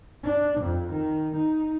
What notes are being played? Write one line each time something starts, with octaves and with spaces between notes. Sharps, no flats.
D4
F2
D#3
D#4